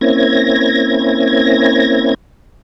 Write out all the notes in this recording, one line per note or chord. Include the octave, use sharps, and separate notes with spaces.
A#3 C4 C#4 E4 G#6 A#6